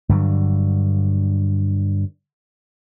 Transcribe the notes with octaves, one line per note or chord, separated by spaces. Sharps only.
G2 D3 F#3